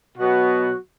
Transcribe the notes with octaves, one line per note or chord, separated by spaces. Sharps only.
B2 F#3 B3 F#4